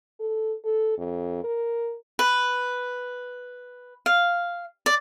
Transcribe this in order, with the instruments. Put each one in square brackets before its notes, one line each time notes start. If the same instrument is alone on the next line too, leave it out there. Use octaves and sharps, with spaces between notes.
[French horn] A4
A4
F2
A#4
[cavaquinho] B4
F5
D5